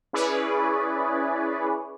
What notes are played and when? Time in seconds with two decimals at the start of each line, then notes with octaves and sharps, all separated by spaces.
0.13 C#4 E4 G#4 B4 C#5 D5